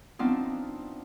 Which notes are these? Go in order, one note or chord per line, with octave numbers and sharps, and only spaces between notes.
F3 B3 C4 D4 D#4 F4